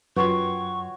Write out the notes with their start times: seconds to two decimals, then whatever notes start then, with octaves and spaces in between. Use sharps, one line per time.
0.16 F#2 F4 F#4 B4 C#5 G5 C6 C#6